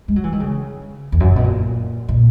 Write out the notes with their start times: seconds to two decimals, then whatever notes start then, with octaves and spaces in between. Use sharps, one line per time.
0.08 G#3
0.16 F#3
0.24 E3
0.32 D#3
0.40 C#3
1.12 E2
1.20 F#2
1.28 A#2
1.36 B2
1.44 A#2
2.09 A#2